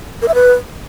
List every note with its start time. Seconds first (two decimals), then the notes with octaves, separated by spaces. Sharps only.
0.22 A#4
0.28 E5
0.34 B4